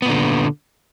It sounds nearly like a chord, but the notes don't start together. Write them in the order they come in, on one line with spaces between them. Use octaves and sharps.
B3 A#2 D3